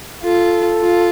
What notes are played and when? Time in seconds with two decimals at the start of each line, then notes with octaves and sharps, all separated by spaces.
0.23 F4 A4
0.82 F4